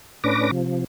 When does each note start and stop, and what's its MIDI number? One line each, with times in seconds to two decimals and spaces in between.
0.24 0.51 45
0.24 0.51 61
0.24 0.51 62
0.24 0.51 71
0.24 0.51 86
0.24 0.51 94
0.51 0.84 48
0.51 0.84 53